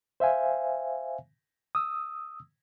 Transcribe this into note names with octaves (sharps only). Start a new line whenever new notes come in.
C5 E5 F5 G#5
D#6 E6